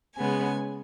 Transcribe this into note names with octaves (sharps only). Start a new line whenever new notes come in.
C#3 G#3 B3 G#5